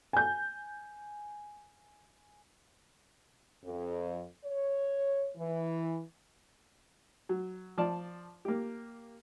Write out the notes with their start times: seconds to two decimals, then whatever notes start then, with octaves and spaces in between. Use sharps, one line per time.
0.13 G#5 G6
3.64 F2
4.45 C#5
5.36 E3
7.29 F#3
7.78 F3 D5 A5
8.45 A#3 G4